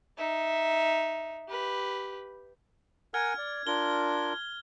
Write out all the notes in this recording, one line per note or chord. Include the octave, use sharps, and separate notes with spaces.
D#4 E5
G4 B4
A#4 F#5 G#5 F6 G#6
D5
D4 F4 A#4 G7